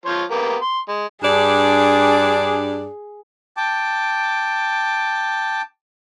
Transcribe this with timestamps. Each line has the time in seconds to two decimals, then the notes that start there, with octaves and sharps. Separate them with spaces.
0.06 F3 C5 C#5
0.31 A#3 B3 G4
0.62 C6
0.89 G#3
1.23 G2 D4 G#4 D5
3.57 G5 A5 D6